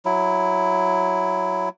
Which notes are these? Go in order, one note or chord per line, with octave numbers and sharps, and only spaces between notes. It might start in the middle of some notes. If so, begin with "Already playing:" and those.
F#3 E4